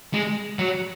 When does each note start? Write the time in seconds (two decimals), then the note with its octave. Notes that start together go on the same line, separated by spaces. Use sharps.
0.14 G#3
0.59 F#3